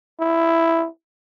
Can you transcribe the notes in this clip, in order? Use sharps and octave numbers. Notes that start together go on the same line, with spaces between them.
E4